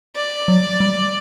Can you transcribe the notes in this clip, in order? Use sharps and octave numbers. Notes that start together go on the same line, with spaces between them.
D5
F#3
G3